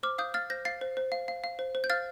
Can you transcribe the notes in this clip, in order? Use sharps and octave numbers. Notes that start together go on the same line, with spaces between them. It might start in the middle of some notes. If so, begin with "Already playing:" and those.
C5 D6 F6
F5 D#6 G6
F5 F6 A6
C5 G6 A#6
F5 A6 C7
C5
C5
F5
F5
F5
C5
C5
G6
F5 F6 A6